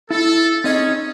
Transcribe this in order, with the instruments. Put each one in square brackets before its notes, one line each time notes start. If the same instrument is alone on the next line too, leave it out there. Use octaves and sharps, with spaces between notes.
[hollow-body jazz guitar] E4 [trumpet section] A4
[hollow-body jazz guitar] C4 D#4 D#5 [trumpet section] C#4 G#4